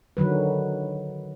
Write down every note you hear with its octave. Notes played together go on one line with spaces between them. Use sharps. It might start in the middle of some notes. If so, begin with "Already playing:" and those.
D3 D#3 F#3 B4